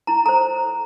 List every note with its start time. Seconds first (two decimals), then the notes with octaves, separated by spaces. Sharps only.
0.07 E4 A#5
0.25 A4 C5 A#5